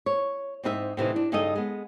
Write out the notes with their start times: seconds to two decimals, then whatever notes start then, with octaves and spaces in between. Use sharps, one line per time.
0.06 C#5
0.63 G#2 C4 D#4 A#4 E5
0.97 A2 C3 E3 D#4
1.16 D4
1.32 G2 C#3 D#4 G#4 A4 D#5
1.55 G#3 B3